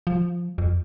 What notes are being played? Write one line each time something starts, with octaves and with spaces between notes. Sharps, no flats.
F3
F2